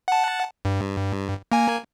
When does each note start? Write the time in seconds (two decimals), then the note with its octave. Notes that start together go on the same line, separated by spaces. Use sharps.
0.08 F#5 A5
0.65 G2
1.52 A#3 G#5